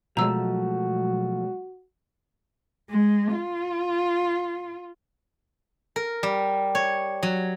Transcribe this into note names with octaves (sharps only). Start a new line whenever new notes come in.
B2 F3 F#3 G#3 A3 F#4 A#5 E6
G#3
F4
A#4
G3
C#5
F#3